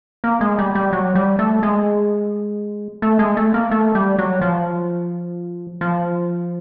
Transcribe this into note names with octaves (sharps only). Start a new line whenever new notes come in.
A#3
G#3
G3
G3
F#3
G3
A3
G#3
A3
G#3
A3
A#3
A3
G3
F#3
F3
F3